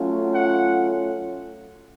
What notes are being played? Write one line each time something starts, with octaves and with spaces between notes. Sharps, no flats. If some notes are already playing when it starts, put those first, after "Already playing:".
Already playing: F#3 A3 C#4 F4
F#5